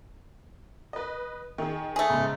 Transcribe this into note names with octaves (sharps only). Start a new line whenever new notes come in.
B4 D#5
D#3 G#4
A3 G#4
G#2 C#3